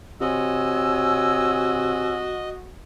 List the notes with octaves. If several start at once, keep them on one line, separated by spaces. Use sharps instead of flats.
C3 F#4 C#5 D#5 G#5 E6